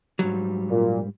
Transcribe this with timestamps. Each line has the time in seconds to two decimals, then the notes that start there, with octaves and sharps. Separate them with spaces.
0.19 G#2 F#3 G3
0.71 A#2